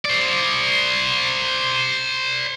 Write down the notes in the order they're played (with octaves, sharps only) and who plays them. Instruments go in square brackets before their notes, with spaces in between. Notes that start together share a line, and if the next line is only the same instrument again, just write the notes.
[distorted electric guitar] C5 D5